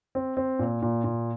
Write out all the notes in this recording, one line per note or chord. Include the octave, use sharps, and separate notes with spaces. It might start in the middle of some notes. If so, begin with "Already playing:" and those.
C4
C4
A#2
A#2
A#2